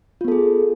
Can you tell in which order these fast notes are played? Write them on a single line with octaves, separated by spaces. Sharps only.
F4 B3 A4 G#4